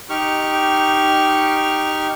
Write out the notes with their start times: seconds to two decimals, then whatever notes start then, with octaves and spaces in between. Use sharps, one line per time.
0.10 D#4 G4 C#6 F6